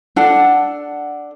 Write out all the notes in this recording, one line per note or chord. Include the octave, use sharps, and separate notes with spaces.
D4 A4 F#5